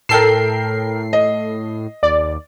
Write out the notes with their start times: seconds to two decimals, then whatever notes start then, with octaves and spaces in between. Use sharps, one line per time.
0.09 A2 A4 A#4 G5 C7 E7
1.13 D#5
2.03 D#2 D5